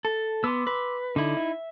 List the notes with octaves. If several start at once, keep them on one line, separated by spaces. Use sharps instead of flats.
A4
B3 C6 D6 E6
B4
D3 D#4 E4
E5